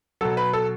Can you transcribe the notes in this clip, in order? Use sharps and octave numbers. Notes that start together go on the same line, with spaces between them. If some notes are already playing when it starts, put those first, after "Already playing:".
B2 F#3 A4
B4
A4